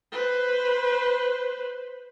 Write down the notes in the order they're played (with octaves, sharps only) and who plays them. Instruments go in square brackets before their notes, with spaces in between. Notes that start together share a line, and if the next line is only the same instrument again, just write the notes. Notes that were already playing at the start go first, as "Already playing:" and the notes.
[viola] B4 C5